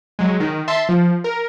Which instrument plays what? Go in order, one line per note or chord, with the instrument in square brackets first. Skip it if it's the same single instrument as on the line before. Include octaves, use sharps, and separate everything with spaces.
[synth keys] F#3 G#3
D#3
E5 A5 C6
F3
A#4